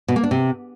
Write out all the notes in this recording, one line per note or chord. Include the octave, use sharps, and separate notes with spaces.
B2
A#3
D4
C3